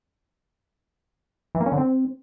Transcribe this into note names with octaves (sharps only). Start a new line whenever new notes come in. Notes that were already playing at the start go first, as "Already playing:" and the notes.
E3
A#3
C#4
D3
C4